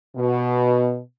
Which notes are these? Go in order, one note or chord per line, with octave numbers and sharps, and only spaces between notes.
B2